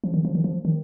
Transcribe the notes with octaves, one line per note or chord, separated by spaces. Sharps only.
F3
D#3
F3
D#3
F3
D#3